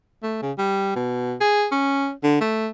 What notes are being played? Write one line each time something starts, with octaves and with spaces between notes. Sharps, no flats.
A3
C#3
G3
B2
G#4
C#4
D3
A3